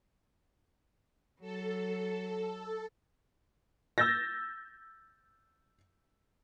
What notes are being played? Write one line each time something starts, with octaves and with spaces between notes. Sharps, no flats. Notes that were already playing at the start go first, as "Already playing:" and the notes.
F#3 A4
E6 G6 A6 A#6